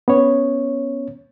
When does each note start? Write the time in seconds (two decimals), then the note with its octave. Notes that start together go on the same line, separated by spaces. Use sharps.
0.08 B3 C#4 C#5